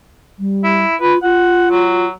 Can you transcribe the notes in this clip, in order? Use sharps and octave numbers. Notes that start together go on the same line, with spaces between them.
G3
E4
F4 B4
F4 F#5
F#3